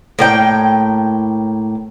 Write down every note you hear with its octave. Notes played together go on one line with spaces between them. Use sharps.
A2 A#3 G5